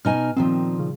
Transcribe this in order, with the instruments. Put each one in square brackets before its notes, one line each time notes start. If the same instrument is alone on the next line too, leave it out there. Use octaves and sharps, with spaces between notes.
[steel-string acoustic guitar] B2 D#4 G#5 [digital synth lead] F6
[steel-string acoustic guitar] A#2 D#3 F3 [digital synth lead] C4
[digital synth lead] C#3